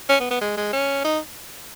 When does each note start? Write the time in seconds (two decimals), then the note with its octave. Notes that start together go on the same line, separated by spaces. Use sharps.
0.09 C#4
0.20 B3
0.31 B3
0.41 G#3
0.57 G#3
0.73 C#4
1.05 D#4